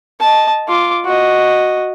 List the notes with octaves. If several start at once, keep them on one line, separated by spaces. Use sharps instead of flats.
D#5 A5
F4 D6
F#4 D#5